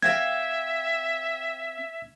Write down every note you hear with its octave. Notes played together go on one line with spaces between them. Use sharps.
C4 E5 F5 G5 G#6